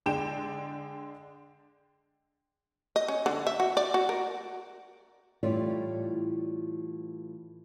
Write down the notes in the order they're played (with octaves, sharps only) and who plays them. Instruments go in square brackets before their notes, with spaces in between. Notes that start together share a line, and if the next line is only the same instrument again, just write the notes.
[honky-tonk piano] D3 G#3 D4 G5 E7
[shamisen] D#5
C#4
D3
E5
F#4
D5
F#4
A#4
[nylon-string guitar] A2 E3 G3 F4 C#5 D5